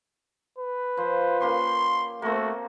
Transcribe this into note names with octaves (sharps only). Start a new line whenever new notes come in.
B4
F3 C5
A#3 C#4 G4 C6
A3 A#3 C4 F#4